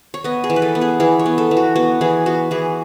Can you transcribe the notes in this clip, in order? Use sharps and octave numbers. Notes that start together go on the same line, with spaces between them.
C#5
B3 D#5
G#4
E3
B4
A4
B3
G#4
E3 G#4
C#5
B3
A4
E3
F#4
B3 F#4
E3 G#4
B3 F#4
E3 G#4